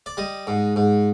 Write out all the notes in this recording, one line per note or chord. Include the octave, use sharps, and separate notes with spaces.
D5
G3 D#5
G#2
G#2